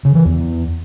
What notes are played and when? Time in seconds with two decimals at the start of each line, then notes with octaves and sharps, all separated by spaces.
0.05 C#3
0.15 E3
0.25 E2